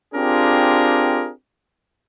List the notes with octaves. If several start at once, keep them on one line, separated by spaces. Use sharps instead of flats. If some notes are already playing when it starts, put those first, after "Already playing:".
C4 D4 F4 G4 G#4 A#4